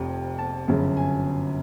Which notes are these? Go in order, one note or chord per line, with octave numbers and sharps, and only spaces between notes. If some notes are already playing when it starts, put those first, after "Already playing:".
Already playing: F1 F2 C3
A5
G1 F#2 C#3
G#5